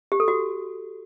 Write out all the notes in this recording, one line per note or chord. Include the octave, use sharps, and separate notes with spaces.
G4
A4
F#4